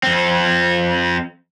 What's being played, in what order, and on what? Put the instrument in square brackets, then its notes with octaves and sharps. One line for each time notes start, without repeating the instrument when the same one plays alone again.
[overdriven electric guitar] F2 C4